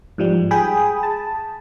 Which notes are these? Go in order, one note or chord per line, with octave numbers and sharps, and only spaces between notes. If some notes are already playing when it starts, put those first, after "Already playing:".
G#2 F3 G3
G#4 G5 G#5 B5 D#6
A5